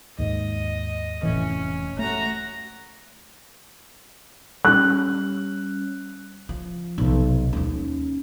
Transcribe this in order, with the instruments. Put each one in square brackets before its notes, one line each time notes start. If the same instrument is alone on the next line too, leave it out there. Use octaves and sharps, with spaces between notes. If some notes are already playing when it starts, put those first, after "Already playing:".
[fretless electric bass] D#2 G#2 [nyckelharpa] D#5
[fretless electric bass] F1 A2 E3 [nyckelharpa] C#4
[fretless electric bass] A3 [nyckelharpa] F#4 A#5
[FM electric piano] G3 C#4 [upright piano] F#6
[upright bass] F3
B1 C3
D#2 C#4